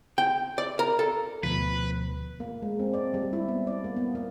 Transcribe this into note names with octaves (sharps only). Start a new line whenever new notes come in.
G5
D5
A#4
A4
D2 B2 F3 B4
A#3
G#3
C4
D5
G3
E4
B3
D5
A#3
B3
A#3